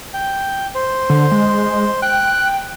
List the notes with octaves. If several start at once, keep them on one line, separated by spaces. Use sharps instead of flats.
G5
C5
D3
G#3
G5 F#6